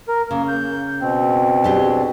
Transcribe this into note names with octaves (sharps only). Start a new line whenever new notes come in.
A#4
C#3 A#3
G6
B2 C4
D4 G4 G#4